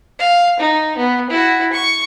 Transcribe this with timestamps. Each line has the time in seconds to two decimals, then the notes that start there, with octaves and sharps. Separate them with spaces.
0.19 F5
0.60 D#4
0.97 B3
1.30 E4 F#4
1.73 C#6